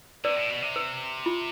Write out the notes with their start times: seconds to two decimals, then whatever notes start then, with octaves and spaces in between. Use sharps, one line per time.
0.25 C3 B4 D5
0.37 A2
0.50 B2
0.62 C3
0.76 B4
1.26 F4